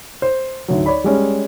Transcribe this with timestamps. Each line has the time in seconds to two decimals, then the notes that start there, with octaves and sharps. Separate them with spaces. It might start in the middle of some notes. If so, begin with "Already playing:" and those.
0.22 C5
0.68 G#1 D2 F#3
0.86 C#5 D5 B5
1.04 G3 G#3 C#4